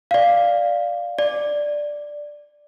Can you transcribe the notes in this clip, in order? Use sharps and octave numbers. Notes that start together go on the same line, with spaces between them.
D5 F5
D5